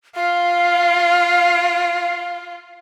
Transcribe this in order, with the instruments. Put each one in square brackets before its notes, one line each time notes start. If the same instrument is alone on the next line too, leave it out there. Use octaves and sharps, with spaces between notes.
[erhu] F4 [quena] F5